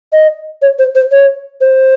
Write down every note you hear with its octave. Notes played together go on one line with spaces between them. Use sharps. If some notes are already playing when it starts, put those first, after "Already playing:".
D#5
C#5
C5
C5
C#5
C5